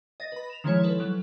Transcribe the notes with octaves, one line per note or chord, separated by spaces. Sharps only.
D#5 A6 A#6
B4 B5
E7 F7
D#3 F3 G#3 E4 C#5
A4 B4
F#3